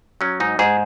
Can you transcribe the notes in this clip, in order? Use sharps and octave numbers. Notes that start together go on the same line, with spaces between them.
F#3 C#4
G#2 D#4
G#2 G#4